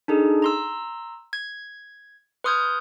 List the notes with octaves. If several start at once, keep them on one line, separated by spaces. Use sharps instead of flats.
D4 D#4 G#4 A4
A#5 C6 E6
G#6
B4 C6 D#6 F6 G6 G#6